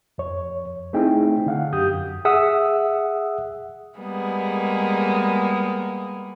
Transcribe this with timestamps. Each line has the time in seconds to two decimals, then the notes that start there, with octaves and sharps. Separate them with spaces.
0.18 F2 C#5
0.93 A3 C4 D#4 E4 G#4 G5
1.46 D3 F5 F#5
1.73 F#2 G4 D#6 G6
2.25 G#4 E5 F#5 D#6 E6
3.97 G3 G#3 A#3 B3 G#4